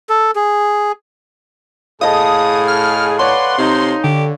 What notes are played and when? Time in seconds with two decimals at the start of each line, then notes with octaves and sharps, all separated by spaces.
0.09 A4
0.36 G#4
2.01 A2 G#4 A4 D#5 F5 D#6
2.68 F6
3.19 B4 C#5 D5 F#5 C6
3.58 C3 D#4
4.04 D3 G4